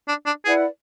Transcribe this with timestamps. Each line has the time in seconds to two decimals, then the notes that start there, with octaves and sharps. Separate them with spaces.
0.08 D4
0.26 D4
0.45 E4 G#4 B4 D5 F#5